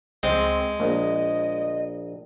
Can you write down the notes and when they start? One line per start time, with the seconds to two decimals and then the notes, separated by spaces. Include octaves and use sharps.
0.23 C#2 G#3 C4
0.80 A#1 A#3 D#5